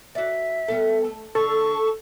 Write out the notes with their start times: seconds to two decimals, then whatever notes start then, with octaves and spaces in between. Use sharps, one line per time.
0.15 F#4 D5 E5
0.68 G3 B3 A4
1.04 A3
1.35 D3 A4 C#6